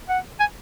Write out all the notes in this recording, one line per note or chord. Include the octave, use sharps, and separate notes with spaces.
F#5
G#5